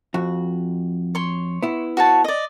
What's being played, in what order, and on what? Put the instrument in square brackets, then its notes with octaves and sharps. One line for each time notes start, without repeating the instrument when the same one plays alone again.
[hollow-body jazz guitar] F2 F#4
[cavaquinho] C#5 C6
[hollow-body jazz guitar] B3 E4
[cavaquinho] F#4 C#5 A5
D5 D#5